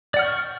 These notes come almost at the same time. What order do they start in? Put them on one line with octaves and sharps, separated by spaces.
D5 F#5 F6 G5 C#6